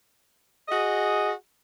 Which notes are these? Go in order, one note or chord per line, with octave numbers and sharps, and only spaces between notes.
F#4 G#4 D#5